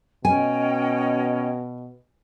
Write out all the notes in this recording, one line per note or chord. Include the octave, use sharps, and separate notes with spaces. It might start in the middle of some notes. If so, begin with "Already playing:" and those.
B2 C#4 D#5 G5 G#5